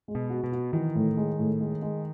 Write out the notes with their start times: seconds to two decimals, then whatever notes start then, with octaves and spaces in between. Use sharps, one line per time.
0.08 G#3
0.15 B2
0.30 F#4
0.44 B2
0.52 F#4
0.73 D#3 E3
0.95 A2
1.17 G#3
1.39 A2
1.61 G#3
1.82 G#3